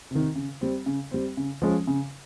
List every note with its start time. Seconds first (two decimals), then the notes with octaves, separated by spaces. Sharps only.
0.11 C3 D#3
0.36 C#3
0.61 G3 C4
0.86 C#3
1.11 G3 C4
1.37 C#3
1.62 F3 G#3 C#4
1.87 C#3